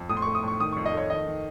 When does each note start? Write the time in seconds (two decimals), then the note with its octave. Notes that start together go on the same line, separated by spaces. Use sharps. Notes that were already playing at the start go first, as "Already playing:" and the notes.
Already playing: F2
0.09 A2 D#6
0.17 C6
0.22 C#6
0.26 A3
0.35 D#6
0.43 A2 C#6
0.60 D#3 D#6
0.72 C#6
0.76 F2
0.85 D#5
0.93 A3 C#5
1.10 D#3 D#5
1.26 D#3